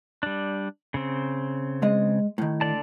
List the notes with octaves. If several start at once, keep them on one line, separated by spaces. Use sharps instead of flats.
G3 D4
C#3 C4
G#3 D#5
A2 D#3
D3 D5 A5